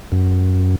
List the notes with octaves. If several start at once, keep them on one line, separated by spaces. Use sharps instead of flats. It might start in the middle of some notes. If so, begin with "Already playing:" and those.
F#2